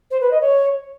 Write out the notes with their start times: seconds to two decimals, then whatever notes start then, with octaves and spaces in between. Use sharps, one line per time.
0.11 C5
0.21 B4
0.31 D#5
0.41 C#5